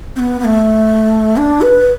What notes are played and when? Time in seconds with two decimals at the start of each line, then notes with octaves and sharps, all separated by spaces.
0.16 C4
0.19 B3
0.40 B3
0.45 A3
1.37 D4
1.62 B4